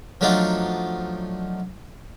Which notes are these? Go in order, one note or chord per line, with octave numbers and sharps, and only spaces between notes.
F3 F#3 A3 D4 D#4 F4